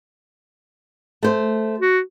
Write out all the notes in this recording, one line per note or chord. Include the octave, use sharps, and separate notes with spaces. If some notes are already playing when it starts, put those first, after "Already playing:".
A3 C5
F#4